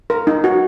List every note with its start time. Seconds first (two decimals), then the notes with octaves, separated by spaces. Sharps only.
0.10 A#4
0.27 D#4
0.44 F#4